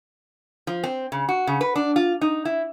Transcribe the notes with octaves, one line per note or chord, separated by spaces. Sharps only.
F3
C4
C#3
F#4
C#3
B4
D4
F4
D#4
E4